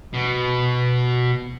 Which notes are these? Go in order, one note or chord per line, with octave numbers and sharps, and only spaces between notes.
B2